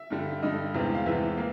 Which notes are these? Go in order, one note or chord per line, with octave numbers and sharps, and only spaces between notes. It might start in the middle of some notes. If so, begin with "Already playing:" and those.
Already playing: E5
G2 D3 G3
G2 D3 G3 D#5
E2 C3 E3 G#3 B3
F5
E2 C3 E3 G#3 B3 E5
A#3